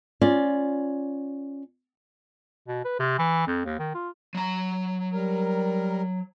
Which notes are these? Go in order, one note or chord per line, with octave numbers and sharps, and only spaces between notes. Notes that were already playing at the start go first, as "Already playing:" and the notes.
C#4 F4 D5
B2
B4
C3
E3
F2
D#2
D#3
F4
F#3 A#5
G3 A#4